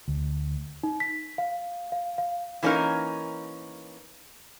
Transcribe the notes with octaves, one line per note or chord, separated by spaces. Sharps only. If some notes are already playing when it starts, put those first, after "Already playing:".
D2
D#4
B6
F5
F5
F5
E3 A#3 C#4 D#4 A#4